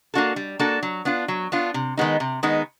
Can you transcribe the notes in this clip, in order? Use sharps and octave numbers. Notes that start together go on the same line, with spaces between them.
A#3 D4 F#4 A4
G3
A#3 D4 F#4 A4
F#3
B3 D4 F4
F#3
B3 D4 F4
C3
D#3 G#3 B3 D#4
C3
D#3 G#3 B3 D#4